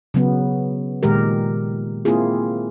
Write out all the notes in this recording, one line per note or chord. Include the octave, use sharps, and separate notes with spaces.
C#3 F#3 B3
A#2 D#3 G#3 G4 A#4
A#3 C4 E4 F4 G#4